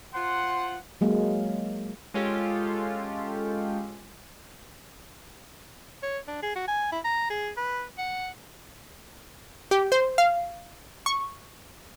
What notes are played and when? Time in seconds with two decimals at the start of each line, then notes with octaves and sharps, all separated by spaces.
0.14 F4 C5 F#5 C6
1.01 F#3 G#3 A#3
2.14 G#3 C#4 F4 G4 A4
6.03 C#5
6.28 D4
6.43 G#4
6.56 F#4
6.68 G#5
6.92 E4
7.04 A#5
7.30 G#4
7.57 B4
7.98 F#5
9.71 G4
9.92 C5
10.18 F5
11.06 C#6